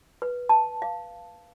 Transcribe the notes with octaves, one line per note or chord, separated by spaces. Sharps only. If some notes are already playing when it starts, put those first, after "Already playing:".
B4
A5
F5